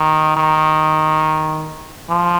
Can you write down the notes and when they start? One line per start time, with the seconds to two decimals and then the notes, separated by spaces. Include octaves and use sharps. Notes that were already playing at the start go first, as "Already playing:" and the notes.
Already playing: D#3
0.36 D#3
2.10 F3